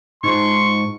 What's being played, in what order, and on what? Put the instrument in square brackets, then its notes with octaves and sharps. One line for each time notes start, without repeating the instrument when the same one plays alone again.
[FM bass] G#2 [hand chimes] D#4 F4 [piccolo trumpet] C6 [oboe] C#6